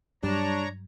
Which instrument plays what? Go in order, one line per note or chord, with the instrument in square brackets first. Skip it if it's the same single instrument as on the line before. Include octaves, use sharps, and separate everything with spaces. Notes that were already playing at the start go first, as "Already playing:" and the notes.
[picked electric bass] G2 F#3 [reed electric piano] G3 [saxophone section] D4 [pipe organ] C#5 A#5